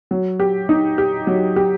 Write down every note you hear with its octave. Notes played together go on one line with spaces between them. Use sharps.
F#3
G4
D#4
G4
F#3
G4